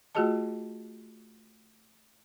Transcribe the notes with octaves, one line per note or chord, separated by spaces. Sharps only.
A3 F4 F#4 G#4 D#5 A5